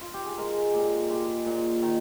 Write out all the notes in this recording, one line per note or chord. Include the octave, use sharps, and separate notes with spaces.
F4
G4
G#4
G#3 A#4
A#2 G4
G#3 G4
A#2
D#3